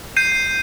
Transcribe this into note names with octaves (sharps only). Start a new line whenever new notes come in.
G6 C7 D#7